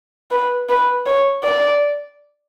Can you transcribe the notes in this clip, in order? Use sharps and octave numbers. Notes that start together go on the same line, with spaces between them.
B4
B4
C#5
D5